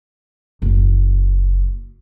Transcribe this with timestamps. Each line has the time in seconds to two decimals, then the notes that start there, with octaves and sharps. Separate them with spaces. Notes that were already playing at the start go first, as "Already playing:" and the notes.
0.62 F#1